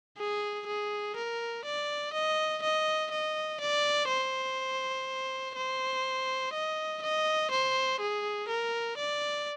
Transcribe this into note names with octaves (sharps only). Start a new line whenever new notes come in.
G#4
G#4
A#4
D5
D#5
D#5
D#5
D5
C5
C5
D#5
D#5
C5
G#4
A#4
D5